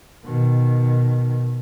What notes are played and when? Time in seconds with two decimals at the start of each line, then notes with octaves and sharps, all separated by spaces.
0.24 B2 D#3